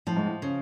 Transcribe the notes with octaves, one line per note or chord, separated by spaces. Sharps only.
A2 F3
G#2
A2
C#3